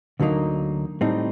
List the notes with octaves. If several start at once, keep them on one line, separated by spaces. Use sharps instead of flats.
D2 D3 F#3 A#3 D#4
A2 G3 C4 D#4